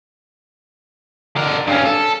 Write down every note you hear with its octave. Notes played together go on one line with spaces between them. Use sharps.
D3 A#4
G2 C#4
A4